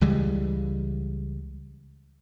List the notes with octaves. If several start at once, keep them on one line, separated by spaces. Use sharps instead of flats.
C#2 E3 G3 G#3